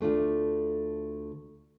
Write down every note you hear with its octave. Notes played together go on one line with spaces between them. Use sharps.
D2 A3 D4 F4